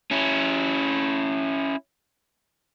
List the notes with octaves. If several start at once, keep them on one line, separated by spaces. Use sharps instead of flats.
C#4 E4